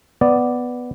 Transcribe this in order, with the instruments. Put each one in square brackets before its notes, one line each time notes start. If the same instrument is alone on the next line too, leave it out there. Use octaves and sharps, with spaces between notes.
[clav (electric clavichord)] B3 D5